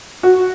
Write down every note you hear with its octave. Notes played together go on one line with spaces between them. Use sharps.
F#4